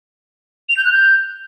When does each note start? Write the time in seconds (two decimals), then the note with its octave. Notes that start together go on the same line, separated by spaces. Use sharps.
0.69 F7
0.77 G6
0.84 F#6
0.92 G6